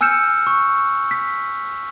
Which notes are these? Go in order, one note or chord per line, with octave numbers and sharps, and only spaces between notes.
G#5 E6 F6 G6 C#7 E7
C#6
B6